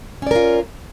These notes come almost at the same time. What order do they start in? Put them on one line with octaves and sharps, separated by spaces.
C#4 D5 A#4 F4